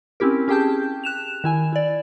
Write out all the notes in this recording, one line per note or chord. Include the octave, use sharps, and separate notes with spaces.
C4 C#4 E4 G4 A#4
C#4 G4 G#4 G5 A5 G6
F#6 E7 F7
D#3 E4 G#5
E4 D5